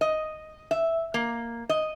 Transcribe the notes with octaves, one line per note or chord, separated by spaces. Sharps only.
D#5
E5
A#3
D#5